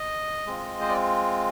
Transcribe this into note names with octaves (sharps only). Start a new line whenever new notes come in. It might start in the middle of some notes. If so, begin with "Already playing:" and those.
Already playing: D#5
G#3 C4 F4
C5
D5